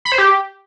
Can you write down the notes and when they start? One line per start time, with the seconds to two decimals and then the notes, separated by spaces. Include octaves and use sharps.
0.05 B5
0.12 C5
0.18 G4